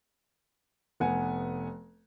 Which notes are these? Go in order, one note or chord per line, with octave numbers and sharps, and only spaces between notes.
F1 B3 F#5 G#5